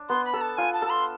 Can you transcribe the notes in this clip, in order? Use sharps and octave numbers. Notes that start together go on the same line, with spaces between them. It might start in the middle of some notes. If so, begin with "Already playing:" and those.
Already playing: D4
B3 C6
B5
A4
A5
F4 G#5
A5
A4
C6